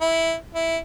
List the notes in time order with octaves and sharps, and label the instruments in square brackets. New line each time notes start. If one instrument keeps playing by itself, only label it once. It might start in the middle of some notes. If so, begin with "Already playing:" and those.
[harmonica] E4
E4